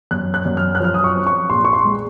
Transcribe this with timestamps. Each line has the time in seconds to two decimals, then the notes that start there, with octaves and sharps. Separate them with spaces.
0.11 F#2 F#6
0.34 F#6
0.45 F#2
0.57 F6
0.75 F#6
0.80 F3 F6
0.94 D#6
1.04 C#6
1.15 C4
1.27 C#6
1.50 A#1 C6
1.65 C#6
1.73 C6
1.85 G#3